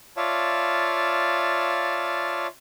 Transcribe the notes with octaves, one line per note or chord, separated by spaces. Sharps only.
F4 C#5 D5 E5 F5 A5